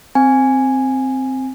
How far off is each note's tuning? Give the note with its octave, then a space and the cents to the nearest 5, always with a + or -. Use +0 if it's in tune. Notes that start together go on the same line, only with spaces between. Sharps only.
C4 +0 G#5 +0